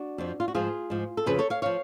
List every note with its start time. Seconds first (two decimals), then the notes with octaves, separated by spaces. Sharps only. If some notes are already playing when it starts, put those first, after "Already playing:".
Already playing: D4 F#4
0.18 F2 F3
0.40 F4
0.48 F#4
0.55 G#2 F3 F4 G#4
0.90 G#2 F3
1.17 A4
1.26 F2 C#3 F3 G#4 B4
1.39 A4 C#5
1.50 C#5 F5
1.62 F3 C#5 F5